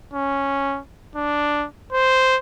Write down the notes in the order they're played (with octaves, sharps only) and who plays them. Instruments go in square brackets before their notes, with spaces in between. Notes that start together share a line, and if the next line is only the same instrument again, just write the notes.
[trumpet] C#4
D4
C5